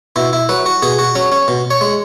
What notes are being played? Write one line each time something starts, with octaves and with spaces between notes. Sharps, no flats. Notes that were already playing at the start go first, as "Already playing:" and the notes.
B2 E4
E4
F#3 B4
F#4
B2 G#4
F#4
F#3 C#4
C#4
B2
C#5
G#3